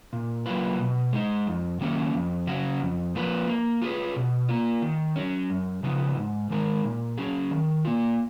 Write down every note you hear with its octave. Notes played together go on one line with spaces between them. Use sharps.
A#2
F#3 A#3 F4 B4
B2
G#3 D#4
F2
D#3 F#3 A#3 C#4
F2
C#3 F#3 C#4 F#4
F2
F3 A#3 F4 B4
A#3
F4 G#4 B4
B2
A#3 F4
D#3
F#3 C#4
F#2
C#3 F3 B3 D#4
G#2
D#3 G#3 D#4 A#4
A#2
F#3 C#4 G#4
D#3
A#3 F4